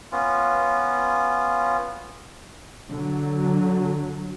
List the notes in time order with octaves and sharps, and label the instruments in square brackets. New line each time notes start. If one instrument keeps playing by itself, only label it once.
[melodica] B3 C#4 F4
[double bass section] D3 F#3